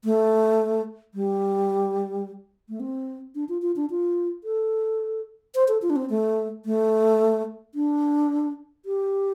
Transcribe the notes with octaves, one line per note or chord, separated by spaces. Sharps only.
A3
G3
A3
C4
D4
F4
F4
D4
F4
A4
C5
A4
F4
D4
C4
A3
A3
D4
G4